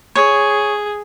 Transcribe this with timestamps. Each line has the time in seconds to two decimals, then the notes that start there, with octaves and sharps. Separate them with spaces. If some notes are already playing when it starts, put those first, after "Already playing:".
0.16 G#4 C#5